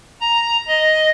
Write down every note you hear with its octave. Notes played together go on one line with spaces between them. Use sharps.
A#5
D#5